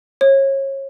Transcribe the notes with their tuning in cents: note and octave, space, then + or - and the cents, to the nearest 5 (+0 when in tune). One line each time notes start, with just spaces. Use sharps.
C#5 -30